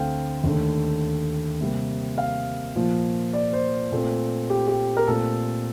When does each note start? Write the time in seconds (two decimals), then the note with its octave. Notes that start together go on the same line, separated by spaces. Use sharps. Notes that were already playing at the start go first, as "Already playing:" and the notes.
Already playing: D2 D3 A3 C4 F5 G5
0.44 D#2 D3 A3
1.61 C3 G3 A#3
2.18 F5
2.76 A#2 F3 A#3
3.33 D5
3.53 C5
3.92 A#2 A3 C4
4.50 G4
4.68 G4
4.97 A#4
5.07 A#2 A3 C4 A4